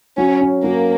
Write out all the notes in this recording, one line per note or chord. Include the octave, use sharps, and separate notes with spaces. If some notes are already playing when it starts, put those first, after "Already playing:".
F#3 C#4
C#4
F#3 A#3